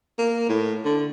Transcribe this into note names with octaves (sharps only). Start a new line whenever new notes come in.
A#3
A2
D3